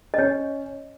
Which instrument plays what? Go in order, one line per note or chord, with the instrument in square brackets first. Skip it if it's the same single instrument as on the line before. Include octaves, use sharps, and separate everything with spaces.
[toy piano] D#5
[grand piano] C#4 [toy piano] C#5